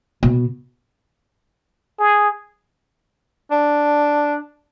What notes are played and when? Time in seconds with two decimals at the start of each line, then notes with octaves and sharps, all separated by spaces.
0.23 B2
1.99 G#4
3.51 D4